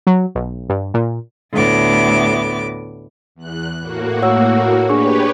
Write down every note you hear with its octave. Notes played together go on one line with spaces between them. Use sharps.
F#3
B1
G2
A#2
D2 A2 B3 D6
E2 F#6
A2 A#3 F#4
C#5 F#5 E6
D4 G4 G#4 B4 C#5 C#6